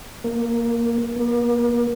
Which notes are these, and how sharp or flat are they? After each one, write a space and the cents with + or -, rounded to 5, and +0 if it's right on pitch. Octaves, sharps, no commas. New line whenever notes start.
A#3 +5
A#3 +40